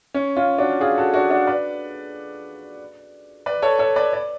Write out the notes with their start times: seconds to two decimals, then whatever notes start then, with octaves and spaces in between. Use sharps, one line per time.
0.14 C#4
0.36 C#4 F4
0.58 D4 F#4
0.81 F4 G#4
0.98 F#4 A4
1.14 D4 F#4
1.30 D4 F#4
1.47 B4 D5
3.46 B4 D5
3.62 A4 C#5
3.79 A4 C#5
3.96 B4 D5
4.13 D5